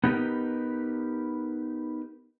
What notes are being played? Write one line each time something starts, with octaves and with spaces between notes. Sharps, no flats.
B3 D#4 G4 A#4 B4